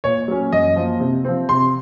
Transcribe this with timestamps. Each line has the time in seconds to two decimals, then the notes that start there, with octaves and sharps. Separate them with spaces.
0.04 A#2 C#5
0.28 F#3 A#3 C#4
0.52 F#2 D#5
0.76 F3 A#3
1.00 C3
1.25 F3 C4
1.49 C3 C6